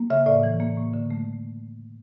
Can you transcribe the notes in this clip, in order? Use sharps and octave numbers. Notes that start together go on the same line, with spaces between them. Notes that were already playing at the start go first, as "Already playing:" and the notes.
Already playing: A#3
C#3 E5
A2 D5
E3
A#3
A2
D3
A3